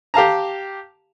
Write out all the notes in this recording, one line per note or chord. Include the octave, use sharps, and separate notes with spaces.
G4 F5 A5 A#5